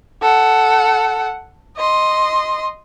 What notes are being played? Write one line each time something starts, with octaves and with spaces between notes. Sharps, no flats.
A4 F#5
D#5 C6